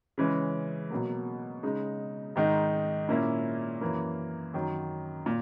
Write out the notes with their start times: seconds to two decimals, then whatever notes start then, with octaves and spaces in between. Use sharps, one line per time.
0.18 C#3 E3 G#3 C#4
0.90 B2 F#3 A#3
1.63 C#3 G#3 D#4
2.36 G#2 D#3 G#3 D#4
3.09 A#2 A#3 C#4 E4
3.81 F#2 E3 A#3
4.54 F#2 D#3 F#3
5.26 A#2